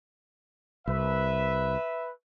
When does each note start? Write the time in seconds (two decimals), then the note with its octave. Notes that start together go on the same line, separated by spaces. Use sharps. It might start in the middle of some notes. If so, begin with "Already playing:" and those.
0.88 C2 B4 E5